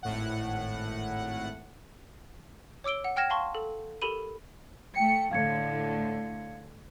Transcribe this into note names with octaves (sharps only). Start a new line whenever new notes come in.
G#1 A2 F#5
C#5 D6 E6 D7 G7
F#5
F#5 G5 F6 G#6 A#6 E7
F5 A5 C6 C#6
A4
G4 A4 A#4 B5 D#7
A3 G5 C#7
A2 D3 F5 G#6 C#7